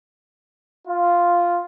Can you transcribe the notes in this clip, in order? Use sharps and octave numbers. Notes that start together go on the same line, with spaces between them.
F4